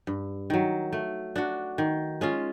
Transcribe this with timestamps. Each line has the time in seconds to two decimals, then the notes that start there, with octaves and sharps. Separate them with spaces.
0.07 G2
0.50 D#3 F#3
0.93 A3
1.36 D4 F#4
1.78 D#3
2.21 G#3 C#4 F4